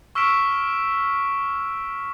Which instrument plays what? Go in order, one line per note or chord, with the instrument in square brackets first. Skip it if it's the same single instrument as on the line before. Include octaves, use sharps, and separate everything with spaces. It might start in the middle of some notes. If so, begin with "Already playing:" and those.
[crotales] C#6 E6 F6 B6 D7 E7